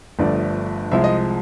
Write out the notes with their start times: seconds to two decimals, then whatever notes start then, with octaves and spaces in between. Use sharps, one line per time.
0.19 G1 G2 D3 F3 A3 D5
0.91 C2 C3 F3 G#3 E5
1.04 D#5